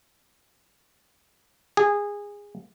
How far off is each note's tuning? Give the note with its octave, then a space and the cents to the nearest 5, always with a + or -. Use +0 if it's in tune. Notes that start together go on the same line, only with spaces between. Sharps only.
G#4 -20